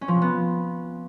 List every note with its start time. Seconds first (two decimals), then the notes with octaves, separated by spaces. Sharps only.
0.01 C#4
0.08 F3
0.15 C3
0.22 B3